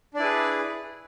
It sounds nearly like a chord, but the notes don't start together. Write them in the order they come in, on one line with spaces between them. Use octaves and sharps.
D4 D5 E4 B4 G#4